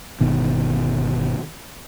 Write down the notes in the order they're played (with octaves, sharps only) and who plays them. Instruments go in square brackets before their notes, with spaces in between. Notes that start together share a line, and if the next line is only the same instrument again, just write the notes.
[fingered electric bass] G1 B2 D#3